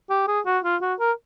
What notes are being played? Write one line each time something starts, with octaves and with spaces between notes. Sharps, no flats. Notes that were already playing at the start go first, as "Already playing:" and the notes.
G4
G#4
F#4
F4
F#4
A#4